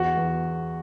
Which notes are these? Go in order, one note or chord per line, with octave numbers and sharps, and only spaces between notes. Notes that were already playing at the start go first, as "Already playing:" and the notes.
Already playing: E2 F#4
E2